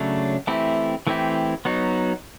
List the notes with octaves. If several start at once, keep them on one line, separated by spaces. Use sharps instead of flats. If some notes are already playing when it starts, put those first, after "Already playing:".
Already playing: C#3 F#3 A3 D4
E3 A3 C4 E4 G4
E3 A3 C4 E4 G4
F#3 B3 D#4 F#4